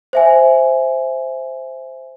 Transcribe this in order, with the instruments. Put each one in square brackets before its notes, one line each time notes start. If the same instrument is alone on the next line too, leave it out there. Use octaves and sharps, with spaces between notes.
[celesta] C5 E5 G#5